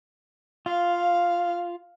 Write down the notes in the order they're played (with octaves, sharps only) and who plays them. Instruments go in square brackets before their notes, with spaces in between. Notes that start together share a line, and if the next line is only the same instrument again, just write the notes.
[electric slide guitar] F4 [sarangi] F5